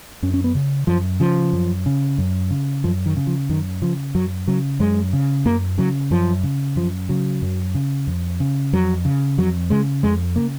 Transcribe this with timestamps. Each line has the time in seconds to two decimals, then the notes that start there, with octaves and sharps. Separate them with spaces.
0.23 F#2 C#4
0.34 C#4
0.44 B3
0.55 C#3
0.87 F#2 F3
1.20 C#3 F3
1.53 F#2
1.86 C#3
2.18 F#2
2.51 C#3
2.84 F#2 F3
3.06 D#3
3.16 C#3
3.27 F3
3.49 F#2 D#3
3.82 C#3 F3
4.15 F#2 F#3
4.48 C#3 F#3
4.80 F#2 G#3
5.13 C#3
5.46 F#2 A#3
5.78 C#3 F#3
6.11 F#2 F3
6.44 C#3
6.76 F#2 F3
7.09 C#3 F#3
7.42 F#2
7.75 C#3
8.07 F2
8.40 C#3
8.73 F2 F#3
9.05 C#3
9.38 F2 F#3
9.70 C#3 G#3
10.03 F2 G#3
10.36 C#3 A#3